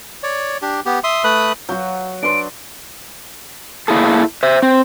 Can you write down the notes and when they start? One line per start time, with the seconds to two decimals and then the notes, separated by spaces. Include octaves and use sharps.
0.23 C#5 D5
0.62 D4 G4
0.86 B3 G4
1.04 E5 C6 D#6
1.24 A3 B4 B5 D#6 F#6
1.69 F#3 F#4 G6
2.23 D4 B4 C6 D7
3.88 A#3 E4 G#4 A4
4.43 C5 E5
4.62 C4